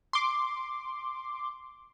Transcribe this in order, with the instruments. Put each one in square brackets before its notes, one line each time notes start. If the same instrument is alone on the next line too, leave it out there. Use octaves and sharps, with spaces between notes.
[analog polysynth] C6 D6